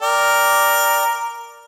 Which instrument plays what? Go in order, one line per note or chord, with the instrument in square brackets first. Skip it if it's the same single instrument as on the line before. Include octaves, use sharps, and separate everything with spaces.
[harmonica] A#4 [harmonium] D5 G5